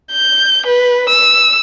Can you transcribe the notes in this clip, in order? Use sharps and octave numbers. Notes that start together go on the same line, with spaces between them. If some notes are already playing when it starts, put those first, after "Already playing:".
G6
B4
E6